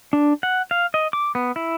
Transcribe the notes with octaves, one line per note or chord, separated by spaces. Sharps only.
D4
F#5
F5
D#5
D6
B3
E4